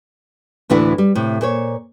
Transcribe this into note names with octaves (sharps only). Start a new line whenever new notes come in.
D2 A2 E3 D4 E4 F#5
G3
A2 C3
A#2 C5 C#5